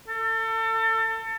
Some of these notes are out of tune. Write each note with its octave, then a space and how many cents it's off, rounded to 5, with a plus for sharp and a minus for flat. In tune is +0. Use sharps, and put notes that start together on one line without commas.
A4 +30